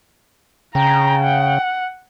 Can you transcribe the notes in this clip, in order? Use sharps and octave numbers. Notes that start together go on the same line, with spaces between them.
C#3 G5 A#5
F#5